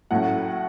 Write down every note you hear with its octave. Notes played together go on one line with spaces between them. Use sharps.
A2 F#3 A3 C#4 F#5